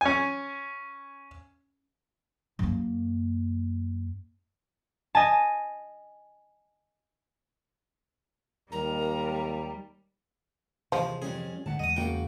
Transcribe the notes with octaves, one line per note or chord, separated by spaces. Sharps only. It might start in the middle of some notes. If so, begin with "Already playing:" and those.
C#4 G#5
F#2 A#3
D#5 G#5 A5
D#2 G3 A#4 A#5
D#2 C3 E3 F3 G#3
F2 G3 C#4 G#4
D2 D3 G#3 F#5 A5
E2 G#3 A3 D#5 D#6
C#3 A#3 F#4 G5